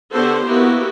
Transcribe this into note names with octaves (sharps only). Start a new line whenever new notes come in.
D3 B3 F#4 G4 A4 C5
A#3 B3 E4 F#4 G4